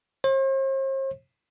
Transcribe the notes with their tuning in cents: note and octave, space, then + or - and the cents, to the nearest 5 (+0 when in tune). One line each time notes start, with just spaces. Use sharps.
C5 +45